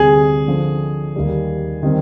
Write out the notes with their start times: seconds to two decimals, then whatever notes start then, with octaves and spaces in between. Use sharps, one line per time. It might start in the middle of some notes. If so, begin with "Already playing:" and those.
Already playing: D2 C3 G3 G#4
0.47 D3 F3 C4
1.16 D#2 D#3 G3
1.83 D#3 G3 C4